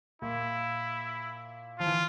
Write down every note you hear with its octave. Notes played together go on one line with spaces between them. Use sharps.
A#2 E4
F3 F4
E3